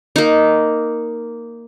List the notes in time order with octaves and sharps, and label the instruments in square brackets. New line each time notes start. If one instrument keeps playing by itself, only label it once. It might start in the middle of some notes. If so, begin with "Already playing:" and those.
[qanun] A#3 D#4